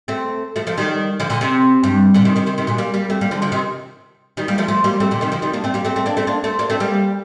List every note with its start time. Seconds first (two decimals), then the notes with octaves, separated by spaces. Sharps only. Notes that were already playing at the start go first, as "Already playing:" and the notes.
0.08 A3 C4
0.56 F3 A3
0.67 F3 A3
0.78 D#3 G3
1.20 D3 F3
1.30 A#2 D3
1.41 C3
1.83 G2
2.14 A#2 D3
2.25 C3 D#3
2.36 C3 D#3
2.47 C3 D#3
2.58 C3 D#3
2.67 A#2 D3
2.78 G3 A#3
2.94 G3 A#3
3.10 A3 C4
3.21 G3 A#3
3.31 D3 F3
3.42 D3 F3
3.52 C3 D#3
4.37 D#3 G3
4.48 G3 A#3
4.58 F3 A3
4.68 F3 A3
4.84 G3 A#3
5.00 A3 C4
5.11 A#2 D3
5.21 C3 D#3
5.32 D3 F3
5.42 D#3 G3
5.53 A#3 D4
5.64 A3 C4
5.74 G3 A#3
5.85 A3 C4
5.96 A3 C4
6.06 A#3 D4
6.17 A3 C4
6.27 A#3 D4
6.44 A3 C4
6.59 A#3 D4
6.70 A3 C4
6.80 G3 A#3